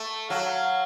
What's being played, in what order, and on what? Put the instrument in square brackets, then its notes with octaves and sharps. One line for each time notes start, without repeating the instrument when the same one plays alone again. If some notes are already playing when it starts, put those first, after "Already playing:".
Already playing: [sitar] A3
[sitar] F#3 [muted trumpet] F5